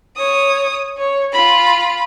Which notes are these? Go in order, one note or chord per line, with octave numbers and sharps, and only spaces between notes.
C#5 D#6
C#5
F4 B5